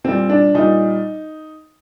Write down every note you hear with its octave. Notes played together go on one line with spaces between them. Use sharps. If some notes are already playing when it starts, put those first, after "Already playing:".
A#2 G3 C4
D4
A#2 G3 D#4